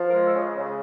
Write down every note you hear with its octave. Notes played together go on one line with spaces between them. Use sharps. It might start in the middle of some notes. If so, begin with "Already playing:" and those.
Already playing: F3
A#4
G#3
A4
C#3
C#3